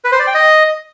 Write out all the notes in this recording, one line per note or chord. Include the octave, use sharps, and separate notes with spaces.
B4
C5
D5
G5
D#5